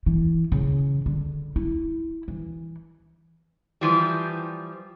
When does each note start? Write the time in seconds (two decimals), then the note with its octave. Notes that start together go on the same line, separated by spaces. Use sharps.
0.06 E3
0.52 C#3
1.06 D3
1.56 E4
2.28 E3
3.81 E3 F3 G3